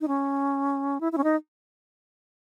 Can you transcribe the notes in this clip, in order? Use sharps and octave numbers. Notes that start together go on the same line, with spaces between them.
D#4
C#4
E4
E4
C#4
D#4